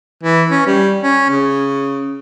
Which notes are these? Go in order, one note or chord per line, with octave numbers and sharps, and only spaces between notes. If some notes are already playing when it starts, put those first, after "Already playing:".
E3
C#4
G3
C#4
C#3